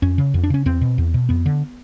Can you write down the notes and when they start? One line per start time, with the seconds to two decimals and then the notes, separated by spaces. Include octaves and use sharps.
0.02 F2 C#4
0.18 C#3
0.34 F2
0.43 D4
0.50 C#3 C#4
0.66 E2 C4
0.81 B2
0.98 E2
1.14 B2
1.29 F2 B3
1.46 D3